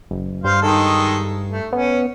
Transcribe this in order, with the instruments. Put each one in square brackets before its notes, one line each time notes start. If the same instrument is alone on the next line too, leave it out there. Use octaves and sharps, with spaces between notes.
[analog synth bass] F#1
[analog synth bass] G2 [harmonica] C5 F5
[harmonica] D#3 G#3 A4
A3
[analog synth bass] B3 [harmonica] C#4